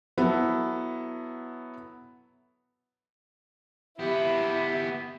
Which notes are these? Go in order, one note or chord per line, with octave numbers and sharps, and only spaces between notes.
F#3 B3 E4 A4
B3 E4 G4